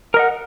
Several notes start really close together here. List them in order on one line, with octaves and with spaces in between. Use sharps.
A#4 D#5 F#5